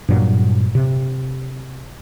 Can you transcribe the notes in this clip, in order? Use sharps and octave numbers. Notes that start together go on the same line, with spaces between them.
G2 A#2 F#3
C3